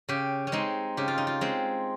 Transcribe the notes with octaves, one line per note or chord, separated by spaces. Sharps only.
C#3 G4
C#4
G#3 C4 D#4
C#3 G4
F4
D#4
F4
G#3 C4